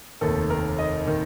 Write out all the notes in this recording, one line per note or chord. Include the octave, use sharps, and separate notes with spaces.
F1 D#2 D#3 A4
A#4
D#5
D#3